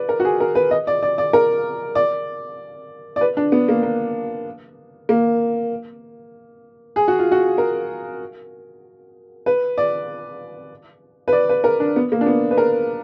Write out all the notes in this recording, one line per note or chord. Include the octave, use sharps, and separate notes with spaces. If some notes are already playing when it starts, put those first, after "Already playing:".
Already playing: B4 D5
A#4
F#4
G#4
A#4
B4
D#5
D5
D5
D5
A#4
D5
D5
B4
D4
B3
A#3
A#3
A#3
G#4
F#4
F4
F#4
A#4
B4
D5
B4
D5
B4
A#4
D4
B3
A#3
D4
B3
B4
A#4